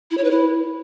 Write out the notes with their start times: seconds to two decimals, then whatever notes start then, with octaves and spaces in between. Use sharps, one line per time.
0.11 E4
0.18 C#5
0.24 B4
0.31 E4